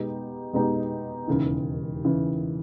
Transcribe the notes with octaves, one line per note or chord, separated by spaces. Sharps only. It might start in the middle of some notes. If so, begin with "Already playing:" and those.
Already playing: B2 G#3 B3 D#4 G4
B2 G#3 B3 D#4 G4
E1 D#2 C#3 E3
C#3 E3